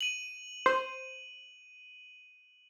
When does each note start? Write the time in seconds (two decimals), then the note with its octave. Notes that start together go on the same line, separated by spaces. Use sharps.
0.01 D#7 F#7
0.66 C5